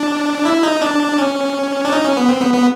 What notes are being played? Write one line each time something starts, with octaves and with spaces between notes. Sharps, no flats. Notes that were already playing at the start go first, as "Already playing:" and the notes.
Already playing: D4
E4
D#4
D4
C#4
D4
D#4
C#4
B3
C4
B3
B3